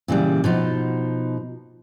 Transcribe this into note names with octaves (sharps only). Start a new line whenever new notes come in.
A#2 C#3 E3 G3
B2 F3 D#4